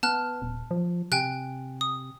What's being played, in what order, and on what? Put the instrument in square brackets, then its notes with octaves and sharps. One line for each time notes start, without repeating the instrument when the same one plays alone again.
[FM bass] B3 [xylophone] A5 F6 F#6
[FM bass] D#1
F3
[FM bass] C3 [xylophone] G5 G#5 F#6
[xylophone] D#6